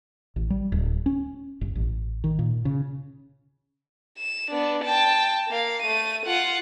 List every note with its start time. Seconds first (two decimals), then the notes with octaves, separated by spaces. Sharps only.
0.36 A1
0.50 G3
0.72 D1
1.06 C#4
1.61 G1
1.75 A1
2.24 D#3
2.39 A#2
2.65 C#3
4.18 E7
4.51 B3 D4
4.84 G5 A5
5.48 A#3 F5
5.82 A3 D#7
6.26 F4 F#5